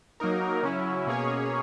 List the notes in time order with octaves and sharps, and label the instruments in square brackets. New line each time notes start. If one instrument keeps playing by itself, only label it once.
[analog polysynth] F#3 A#3 D#4 A#4
C#3 F#3 C#4 E4
B2 A#3 C#4 G#4 C#5